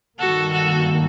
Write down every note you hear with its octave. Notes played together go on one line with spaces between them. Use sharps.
G2 D#3 G3 A#3 F#4 A4
F#4 A4